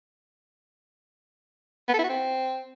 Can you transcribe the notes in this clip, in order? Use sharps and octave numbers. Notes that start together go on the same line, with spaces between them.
B3
A4
E4
F#4
C4